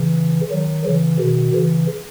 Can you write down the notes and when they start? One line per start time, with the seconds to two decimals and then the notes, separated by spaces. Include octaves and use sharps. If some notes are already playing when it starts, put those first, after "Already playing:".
Already playing: C#3 E3
0.51 D#3 F#3
0.86 C#3 E3
1.20 B2 D#3
1.55 C#3 E3